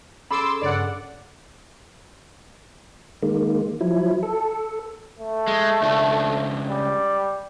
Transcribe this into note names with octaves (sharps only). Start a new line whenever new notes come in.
C#4 G#4 A4 B5 C6 D6 E6
G2 C#3 A#4 C#5 D5 F#5
D#3 G#3 A#3
F3 F#3 E4
A4
A3
G#3
C#2 D4
G3